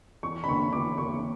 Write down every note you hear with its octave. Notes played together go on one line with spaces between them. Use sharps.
E2 C#6
B5
D3 A#3 D4 C#6
E2 D6
D3 A#3 D4 C#6